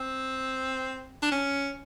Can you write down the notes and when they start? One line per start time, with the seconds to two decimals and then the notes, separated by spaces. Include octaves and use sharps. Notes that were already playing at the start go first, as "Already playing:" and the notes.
Already playing: C4
1.22 D4
1.31 C#4